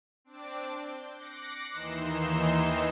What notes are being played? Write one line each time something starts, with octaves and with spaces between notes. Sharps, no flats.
C4 D4 D6
G6
D6 F#6 A#6 C7 C#7
D#2 E3 D#4 C6 C7 E7